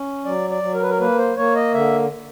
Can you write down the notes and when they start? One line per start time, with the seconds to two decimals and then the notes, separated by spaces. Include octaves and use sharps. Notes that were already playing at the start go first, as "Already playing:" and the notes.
Already playing: C#4
0.25 F#3 D5
0.50 D5
0.63 F#3
0.74 A#4
0.82 B4
0.90 A#4
1.00 A#3 B4
1.18 C5
1.37 A#3 C#5
1.55 D#5
1.74 D3 E5